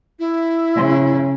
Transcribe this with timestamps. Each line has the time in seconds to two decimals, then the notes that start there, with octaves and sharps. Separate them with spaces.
0.19 E4
0.75 C#3